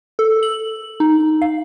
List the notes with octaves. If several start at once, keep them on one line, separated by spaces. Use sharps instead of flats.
A4
F#7
D#4
F5